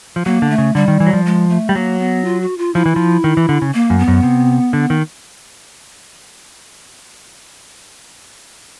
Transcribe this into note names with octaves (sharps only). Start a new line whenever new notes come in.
F3
F#3 A#3
D3
A3
C#3
D3 G3
D#3
E3
F#3
F3
G#3
A3
G3
F#3 A#3
B3
F4
F#4
F4
F3 E4
E3
F3
D#3
E3
D3
C#3
A#3
F#2
B3
F#2
C3
D3
D#3